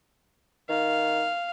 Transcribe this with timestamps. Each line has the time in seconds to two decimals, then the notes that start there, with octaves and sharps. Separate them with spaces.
0.69 D#3 F5